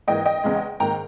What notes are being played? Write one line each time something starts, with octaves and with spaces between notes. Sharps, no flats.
G#2 E3 A#3 D#5 G5
D#5 G5
E2 C#3 G#3
G#2 D#3 A#3 G5 A#5